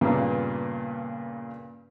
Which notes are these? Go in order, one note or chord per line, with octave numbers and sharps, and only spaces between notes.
G2 A#2 C#3 A#3 B3